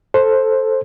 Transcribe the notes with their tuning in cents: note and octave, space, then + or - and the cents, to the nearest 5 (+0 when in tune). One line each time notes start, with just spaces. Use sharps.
A4 +0 C5 +10